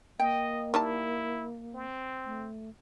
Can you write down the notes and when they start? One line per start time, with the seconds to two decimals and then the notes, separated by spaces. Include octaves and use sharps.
0.19 A#3 D#5 G5
0.74 D#3 G3 E4 A5
1.74 C4
2.26 A3